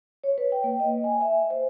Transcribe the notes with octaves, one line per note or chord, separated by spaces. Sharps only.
C#5
B4
G5
A#3
D#5
G#5
E5
C5